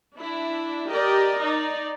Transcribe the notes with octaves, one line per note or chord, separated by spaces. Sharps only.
D4 E4
G4 A#4 D5 D#5
D#4 D5